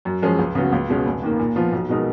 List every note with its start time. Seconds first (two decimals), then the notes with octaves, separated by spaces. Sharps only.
0.05 F#2
0.22 F3 G#3 C#4 G#4
0.39 C#2
0.55 C#3 F#3 B3 F#4
0.72 C#2
0.89 B2 G#3 C#4
1.06 F1
1.23 D#2 D#3 A#3
1.39 A#2
1.56 F3 B3 F4
1.72 B1
1.89 B2 G#3 D#4 A#4